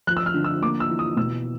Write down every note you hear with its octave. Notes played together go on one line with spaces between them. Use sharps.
F3 F#6
E6
F6
D3
E6
A#3 D6
E6
E3
D#6
B2 E6